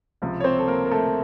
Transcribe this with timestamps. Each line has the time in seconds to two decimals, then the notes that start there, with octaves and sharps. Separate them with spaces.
0.22 C#2 C3 F3
0.40 C#5
0.44 C4 C5
0.59 A4
0.67 A#3 A#4
0.86 A#4
0.91 A3 A4